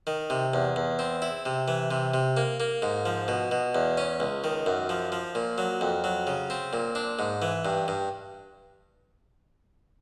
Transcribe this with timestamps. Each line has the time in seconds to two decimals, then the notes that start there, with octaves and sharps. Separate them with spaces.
0.07 D#3
0.30 C3
0.54 E2
0.76 E2
0.99 C4
1.22 E4
1.46 C3
1.68 E3
1.91 C3
2.14 C3
2.37 A#3
2.60 A#3
2.82 G#2
3.06 F3
3.28 B2
3.51 B2
3.75 E2
3.98 C#4
4.20 C#2
4.44 D#3
4.66 F#2
4.89 F3
5.12 F3
5.35 A#2
5.58 F#3
5.81 F2
6.04 F#3
6.27 C#3
6.50 C4
6.73 A#2
6.95 D4
7.19 G#2
7.42 E3
7.65 G2
7.88 G2